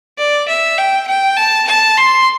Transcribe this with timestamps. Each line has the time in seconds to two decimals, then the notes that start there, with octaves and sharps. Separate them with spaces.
0.18 D5
0.49 E5
0.78 G5
1.08 G5
1.37 A5
1.67 A5
1.97 C6